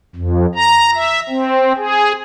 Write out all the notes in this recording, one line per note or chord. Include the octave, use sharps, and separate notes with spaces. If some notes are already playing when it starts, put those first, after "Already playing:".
F2
A#5
E5
C4
G#4